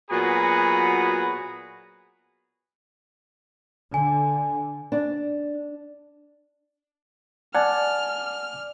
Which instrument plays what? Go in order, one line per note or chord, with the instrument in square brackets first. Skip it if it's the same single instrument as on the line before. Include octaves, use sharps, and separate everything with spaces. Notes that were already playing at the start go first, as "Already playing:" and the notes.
[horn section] A#2 F#3 B3 F#4 G#4 B5
[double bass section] D3 [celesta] G#5
[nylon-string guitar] D4
[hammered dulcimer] D5 [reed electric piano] F#5 G#5 A5 [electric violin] F6